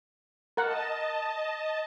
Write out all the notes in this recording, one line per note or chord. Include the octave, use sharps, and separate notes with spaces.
A#4 D#5 F#5 A5